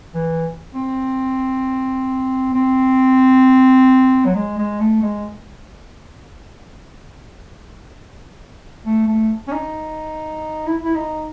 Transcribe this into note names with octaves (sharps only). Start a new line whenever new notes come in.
E3
C4
C4
F#3
G#3
G#3
A3
G#3
A3
A3
C#4
D#4
E4
E4
D#4